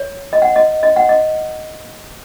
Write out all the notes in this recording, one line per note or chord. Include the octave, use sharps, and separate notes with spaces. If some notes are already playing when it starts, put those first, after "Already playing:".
Already playing: C#5
D#5
F#5
D#5
D#5
F#5
D#5